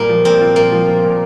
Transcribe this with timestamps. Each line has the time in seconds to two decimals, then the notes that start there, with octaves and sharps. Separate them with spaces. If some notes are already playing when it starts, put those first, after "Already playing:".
Already playing: A#2 G3 A#3
0.09 F3
0.25 A#2 C4
0.41 F4
0.56 A#3 F4
0.72 F3
0.88 F3
1.04 A#2